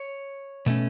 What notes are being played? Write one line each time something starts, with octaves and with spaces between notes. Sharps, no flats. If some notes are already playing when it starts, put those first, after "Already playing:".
Already playing: C#5
B2 A3 C#4